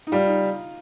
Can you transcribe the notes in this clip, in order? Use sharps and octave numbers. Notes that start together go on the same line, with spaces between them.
D#4
G3 F4
D#4